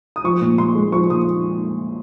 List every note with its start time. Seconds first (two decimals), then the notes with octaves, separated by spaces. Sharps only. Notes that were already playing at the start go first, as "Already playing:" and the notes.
0.16 D#6
0.24 F3 C#6
0.41 A#2
0.58 A#2 C6
0.75 G#3
0.92 F3 C#6
1.10 A#2 D#6